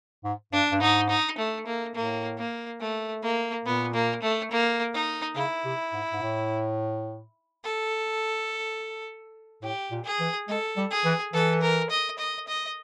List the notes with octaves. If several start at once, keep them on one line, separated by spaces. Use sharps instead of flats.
G#2
G2 D4
G2
G#2 D#4
D#4
A3
A#3
A2 A#3
A#3
A3
A#3
A#2 B3
A#3
A3
A#3
D#4
C#3 E4
C3
G#2
G#2
A2
A4
A2 G4
A#2
G#4
E3
G#3 A4
G3
G#4
E3
E3 A4
A#4
D#5
D#5
D#5